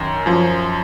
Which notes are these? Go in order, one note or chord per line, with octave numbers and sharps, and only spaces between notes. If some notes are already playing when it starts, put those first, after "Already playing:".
Already playing: F#2 D#3
F#2 F3